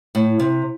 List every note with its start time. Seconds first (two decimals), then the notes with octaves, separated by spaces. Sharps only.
0.15 A2
0.40 C3